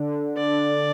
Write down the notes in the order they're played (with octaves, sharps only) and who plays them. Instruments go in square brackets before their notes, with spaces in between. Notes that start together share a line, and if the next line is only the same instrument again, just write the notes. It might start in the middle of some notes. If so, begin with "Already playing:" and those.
Already playing: [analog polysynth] D3 D4
[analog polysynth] D3 [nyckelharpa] D5